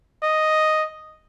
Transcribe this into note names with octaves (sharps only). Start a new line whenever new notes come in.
D#5